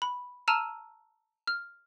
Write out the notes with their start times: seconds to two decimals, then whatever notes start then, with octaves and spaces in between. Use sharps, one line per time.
0.02 B5
0.48 A5 A#5 E6 F6 D#7 E7
1.47 F6